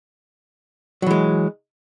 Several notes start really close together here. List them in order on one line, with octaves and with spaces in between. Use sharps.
F#3 E3 G#3